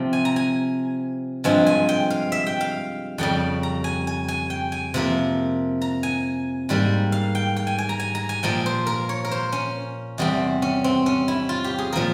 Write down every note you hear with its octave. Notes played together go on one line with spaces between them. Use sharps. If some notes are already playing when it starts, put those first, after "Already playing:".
Already playing: C3 F3 C4
G#5
A#5
G#5
G2 F3 G#3 C4 G#5
G#5
G5
F5
E5
G5
F5
F2 C#3 G3 G5
A#5
G#5
G#5
G#5
G5
G#5
C3 F3 A#3
A#5
G#5
G#2 G3 A#3
F5
G5
G5
G#5
G#5
A#5
G#5
A#5
G#5
A#2 F3 A#3 G5
C5
A#4
C#5
A#4
C5
C#4
E2 C3 G3 C4
C#4
C4
C#4
E4
F4
G4
G#4
A#2 F3 A#3 A#4